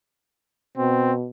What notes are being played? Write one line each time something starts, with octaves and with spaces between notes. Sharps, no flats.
B2 C4